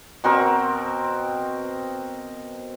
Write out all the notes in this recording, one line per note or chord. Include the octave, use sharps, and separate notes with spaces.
B2 C4 A#4 C#6